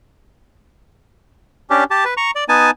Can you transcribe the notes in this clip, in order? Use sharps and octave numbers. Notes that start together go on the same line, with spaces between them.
C#4 D4 G4
G4 A5
B4
A#5 C#6
D5
B3 D#4 G#5 A5